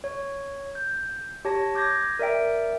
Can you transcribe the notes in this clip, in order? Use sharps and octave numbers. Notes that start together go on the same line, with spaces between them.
C#5
G6
G4 C#5 A5 A#6
D6 G6 G#6 A#6
A#4 D5 E5 G5